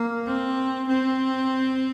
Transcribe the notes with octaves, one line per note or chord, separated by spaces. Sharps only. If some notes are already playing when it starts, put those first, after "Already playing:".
Already playing: A#3
C4
C4